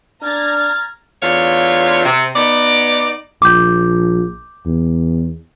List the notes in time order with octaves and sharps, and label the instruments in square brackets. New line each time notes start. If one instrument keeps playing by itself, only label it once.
[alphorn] D4 [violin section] A#5 G#6 A6 [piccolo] F6
[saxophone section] E2 A3 D4 F4 C#5 F5
C3
B3 D#4 D5
[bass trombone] A#1 [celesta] D6 G6
[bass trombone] E2